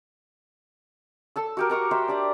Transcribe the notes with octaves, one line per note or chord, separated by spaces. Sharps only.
A4 A5 E6
F#4 G4 A#4
A#4 A#5 C#6 D6
C5 E5 G5 A#5
D4 G4 D5